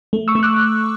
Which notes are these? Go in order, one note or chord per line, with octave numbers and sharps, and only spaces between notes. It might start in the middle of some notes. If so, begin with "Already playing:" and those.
A3
C#6 E6
A3
D6 F#6